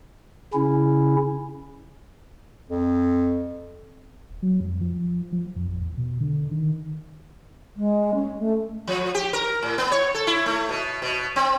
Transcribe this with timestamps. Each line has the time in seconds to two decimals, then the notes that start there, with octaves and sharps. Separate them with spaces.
0.53 C#3 C#4 E4
2.70 F2
4.29 D#1
4.42 F#3
4.60 F2
4.81 F3
5.32 F3
5.56 F2
5.68 A1
5.82 E2
5.97 B2
6.20 D3
6.51 D#3
7.76 G#3
8.14 C#4
8.39 A3
8.87 F3
9.14 G4
9.33 A#4
9.62 A2
9.78 B3
9.92 C#5
10.14 A4
10.27 E4
10.46 A3
10.69 B2
11.02 B2
11.36 C4